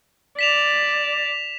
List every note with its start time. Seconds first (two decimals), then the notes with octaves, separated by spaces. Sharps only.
0.39 D5 B6 E7 F7